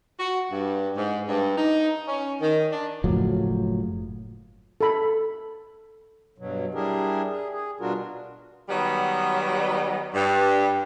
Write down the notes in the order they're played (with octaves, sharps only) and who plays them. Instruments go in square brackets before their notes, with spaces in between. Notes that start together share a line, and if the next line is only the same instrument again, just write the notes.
[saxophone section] F#4
G2
G#2
G2
D#4
C#4
D#3
D4
[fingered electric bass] F#1 A2 F3 F#3
[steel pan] A4 B5
[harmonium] G2 B2 F#3
G3 D4 E4 G4 G#4 A#4
G#4
G#4
B2 G3 D4 F4 F#4 A#4
[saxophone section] D#3 F#3 G3 B3
G2